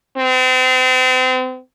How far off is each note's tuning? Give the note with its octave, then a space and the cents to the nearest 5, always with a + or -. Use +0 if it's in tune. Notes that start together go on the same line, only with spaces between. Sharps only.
C4 -35